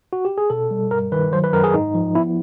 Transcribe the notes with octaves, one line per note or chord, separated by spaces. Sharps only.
F#4
G4
G#4
B2 A4
G3
G2 A#4
D#3 B4
F#3 C5
B4
F#2 A#4
G#4
G#2 D#4
F3
B3 E4